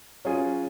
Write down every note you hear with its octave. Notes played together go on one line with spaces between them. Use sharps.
F#3 C#4 F4 G#4